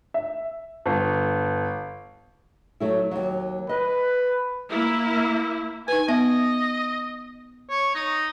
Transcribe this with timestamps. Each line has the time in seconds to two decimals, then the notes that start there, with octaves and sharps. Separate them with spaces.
0.14 E5
0.86 G1
2.80 F#3 A3 E4
3.11 D#2 F#3
3.69 B4 D#5
4.70 A#3 E4
5.88 D#4 B4 G#5
6.08 B3 D#5 E5
7.70 C#5
7.95 D#4